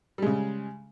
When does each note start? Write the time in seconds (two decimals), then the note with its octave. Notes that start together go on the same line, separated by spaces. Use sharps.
0.18 G3
0.22 G#3
0.26 C#3